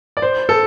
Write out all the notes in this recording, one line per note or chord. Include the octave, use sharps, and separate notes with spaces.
D5
C5
A4